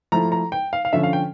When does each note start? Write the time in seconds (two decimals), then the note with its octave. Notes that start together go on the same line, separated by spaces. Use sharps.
0.12 F3 A3 E4 A#5
0.32 A#5
0.52 G5
0.73 F5
0.85 F5
0.93 D3 F3 C#4 E5
1.03 F5
1.13 G5